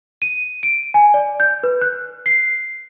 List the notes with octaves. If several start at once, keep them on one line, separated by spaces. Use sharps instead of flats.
D#7
D7
G#5
D5
G6
B4
F#6
C7